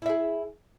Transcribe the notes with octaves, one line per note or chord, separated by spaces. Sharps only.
E4 G#4 E5